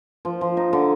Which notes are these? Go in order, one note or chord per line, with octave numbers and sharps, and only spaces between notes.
F3
F3
D#4
D3